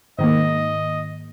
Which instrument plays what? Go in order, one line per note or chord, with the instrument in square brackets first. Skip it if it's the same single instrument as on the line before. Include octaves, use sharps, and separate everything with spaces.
[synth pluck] G#2 D#3 A#3 [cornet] D#5